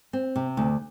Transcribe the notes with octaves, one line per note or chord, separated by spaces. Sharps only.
C4
C3
D2